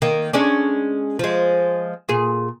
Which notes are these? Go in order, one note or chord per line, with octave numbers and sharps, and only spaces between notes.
D#3 A#3
G#3 C#4 D4
F3 G#3
A#2 G#4